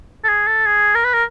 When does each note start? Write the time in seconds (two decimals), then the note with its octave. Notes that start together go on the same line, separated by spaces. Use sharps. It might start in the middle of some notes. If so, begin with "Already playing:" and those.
0.24 A4
0.29 G#4
0.47 A4
0.66 G#4
0.95 A#4
1.05 B4
1.14 A#4